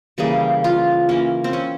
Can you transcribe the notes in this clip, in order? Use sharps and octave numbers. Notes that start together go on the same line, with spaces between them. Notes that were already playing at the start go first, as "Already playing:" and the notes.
C#3 E3 G3 A#3 G#4
F4
E3 A#3 C#4
C4
C#4